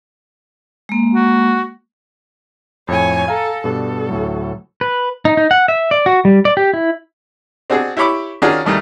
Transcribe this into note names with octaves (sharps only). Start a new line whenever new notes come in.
G#3 A#3
F#4
F2 A2 C#5 G#5
A4 F5 G#5 A#5
G2 B2 D4 A4
D2 A2 F#3
B4
D#4
D#4
F#5
E5
D5
F#4
G3
D5
G4
E4
C4 D4 F#4 G#4
E4 G4 C#5 B5 D6
D#3 C#4 D4 F4 F#4 G#4
D2 G2 D#3 A3